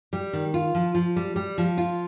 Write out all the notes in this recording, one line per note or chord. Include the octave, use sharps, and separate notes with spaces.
G3
D#3
F4
F3
F3
G3
G3
F3
F4